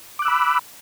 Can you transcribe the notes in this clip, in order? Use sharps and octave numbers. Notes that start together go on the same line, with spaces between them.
B5 D6 E6 F#6